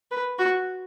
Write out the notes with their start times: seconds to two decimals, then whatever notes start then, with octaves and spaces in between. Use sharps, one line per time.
0.11 B4
0.39 F#4